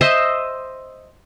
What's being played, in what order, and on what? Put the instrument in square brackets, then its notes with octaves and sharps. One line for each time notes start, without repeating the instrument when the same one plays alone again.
[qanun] C5 D#5 E5